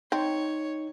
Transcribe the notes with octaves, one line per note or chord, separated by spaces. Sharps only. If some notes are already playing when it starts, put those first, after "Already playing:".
C4 D#4 C#5